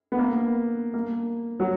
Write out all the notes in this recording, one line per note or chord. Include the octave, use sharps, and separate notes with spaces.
B3
A#3
A#3
F#3